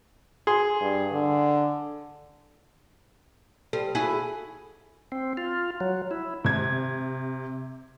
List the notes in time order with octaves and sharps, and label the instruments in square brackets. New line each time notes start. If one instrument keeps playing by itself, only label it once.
[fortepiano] G#4 C6
[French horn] G2
D3
[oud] G3 C5 [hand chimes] A4
[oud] E4 F#4 G#4
[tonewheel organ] C4
F4
F#3
E4
[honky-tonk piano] C3 G#6